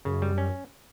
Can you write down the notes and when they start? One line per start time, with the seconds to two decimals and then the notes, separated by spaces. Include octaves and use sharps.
0.05 F#2 C#3
0.22 G3
0.38 C#4